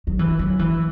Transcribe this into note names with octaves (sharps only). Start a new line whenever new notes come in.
F#3
E3
F#3
E3